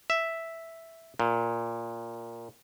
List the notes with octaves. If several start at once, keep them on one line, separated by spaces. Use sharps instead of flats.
E5
A#2